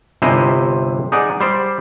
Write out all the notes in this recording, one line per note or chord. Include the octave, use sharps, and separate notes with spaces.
G1 C3 E4 C5 D#5 G#5
D#4 G#4 D5 F#5
G3 C5 D5